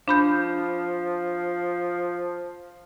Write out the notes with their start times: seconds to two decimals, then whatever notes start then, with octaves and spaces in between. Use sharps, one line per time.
0.08 F3 D4 B5 G6